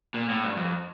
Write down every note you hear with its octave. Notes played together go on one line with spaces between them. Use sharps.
A#2
A2
G2
F2